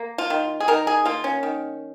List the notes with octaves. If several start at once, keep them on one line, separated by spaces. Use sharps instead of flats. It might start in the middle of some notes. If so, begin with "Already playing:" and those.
Already playing: A#3
F4
D#3
G#4
D#3 A#4
G#4
A#3 F4
C#4
D#3